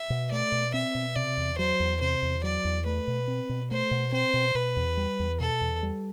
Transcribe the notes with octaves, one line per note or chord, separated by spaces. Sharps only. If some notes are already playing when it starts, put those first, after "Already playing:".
Already playing: E5
B2
A3 D5
B2
C4 E5
B2
C3 D5
E2
F#3 C5
E2
C3 C5
E2
F#3 D5
E2
A3 B4
B2
C4
B2
A3 C5
B2
C4 C5
B2
B2 B4
E2
G3
E2
B2 A4
E2
G3